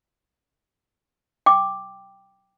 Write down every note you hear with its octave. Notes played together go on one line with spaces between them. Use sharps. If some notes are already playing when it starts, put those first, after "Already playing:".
G5 D6